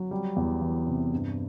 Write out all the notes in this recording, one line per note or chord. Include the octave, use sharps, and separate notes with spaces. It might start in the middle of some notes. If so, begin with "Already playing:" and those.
Already playing: F#3
G3
E2
E3
C3
G2